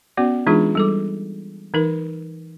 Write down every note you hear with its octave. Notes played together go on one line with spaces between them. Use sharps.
B3 C#4 F#4 D5
E3 G#3 D4 D#4 F4 G#4
G3 A4 D6
E3 D#4 A#4